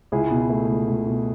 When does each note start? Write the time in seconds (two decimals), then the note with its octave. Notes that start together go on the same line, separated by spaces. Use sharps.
0.12 C#2 E4 G#4
0.31 B2
0.50 A3
0.68 C#2
0.88 C#2
1.06 B2